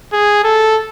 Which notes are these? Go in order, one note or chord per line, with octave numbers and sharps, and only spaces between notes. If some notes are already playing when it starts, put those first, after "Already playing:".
G#4
A4